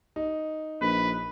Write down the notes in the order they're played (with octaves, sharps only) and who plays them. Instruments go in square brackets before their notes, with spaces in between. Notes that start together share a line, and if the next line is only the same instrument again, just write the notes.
[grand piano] D#4
[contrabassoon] A#1 [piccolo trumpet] B4